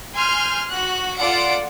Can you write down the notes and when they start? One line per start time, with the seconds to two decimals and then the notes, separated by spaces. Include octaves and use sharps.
0.15 G#5 C6 F6 G6
0.69 F#4 F#6
1.17 F4 A4 D5 F#5 D7